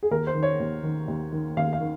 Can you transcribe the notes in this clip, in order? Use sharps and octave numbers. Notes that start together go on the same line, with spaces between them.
G#4
D#2 A#4
C5
D#3
C#5
D#2
D#3
D#2
D#3
D#2 F5
F5
D#3